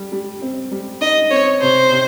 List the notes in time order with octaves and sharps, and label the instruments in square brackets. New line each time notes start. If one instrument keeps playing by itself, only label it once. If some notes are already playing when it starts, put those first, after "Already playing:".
Already playing: [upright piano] G3
G3
C4
G3
[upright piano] D#4 [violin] D#5
[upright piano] C4 [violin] C#5
[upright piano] C3 [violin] C5
[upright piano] C3